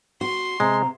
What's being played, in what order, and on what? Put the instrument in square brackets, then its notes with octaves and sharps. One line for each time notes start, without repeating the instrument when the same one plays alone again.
[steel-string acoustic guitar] F#4 [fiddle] C6
[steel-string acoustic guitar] C3 [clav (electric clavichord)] G#3 [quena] A#5